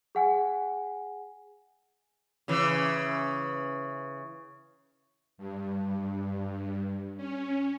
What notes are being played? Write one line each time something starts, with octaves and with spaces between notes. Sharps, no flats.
G#4 F#5 G#5
C#3 E3
G2
C#4